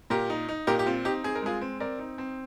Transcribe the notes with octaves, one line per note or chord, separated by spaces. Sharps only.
A#2 G4 A#4
D#4
D#4
A#2 G4 A#4
G4
C4 F4
D#4 G4
C4 G#4
A#4
G#3 F4 G#4
C4
C4 A#4 D5
D#4
C4